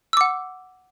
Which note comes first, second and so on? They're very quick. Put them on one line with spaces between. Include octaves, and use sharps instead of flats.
E6 D6 F#5